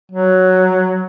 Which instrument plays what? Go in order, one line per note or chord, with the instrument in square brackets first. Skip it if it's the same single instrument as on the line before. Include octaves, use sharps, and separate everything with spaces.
[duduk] F#3